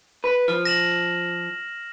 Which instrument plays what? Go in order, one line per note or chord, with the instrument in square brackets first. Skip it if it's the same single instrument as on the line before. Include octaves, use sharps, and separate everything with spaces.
[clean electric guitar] B4
[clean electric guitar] F3 [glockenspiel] F6
[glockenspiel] A#6 E7 F#7